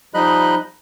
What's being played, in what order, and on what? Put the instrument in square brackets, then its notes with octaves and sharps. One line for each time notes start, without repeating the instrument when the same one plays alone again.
[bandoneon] F3 G3 D#4 D#5 B5 F#6